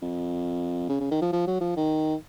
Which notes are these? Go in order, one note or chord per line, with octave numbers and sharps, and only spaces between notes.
F2
C#3
C#3
D#3
F3
F3
F#3
F3
D#3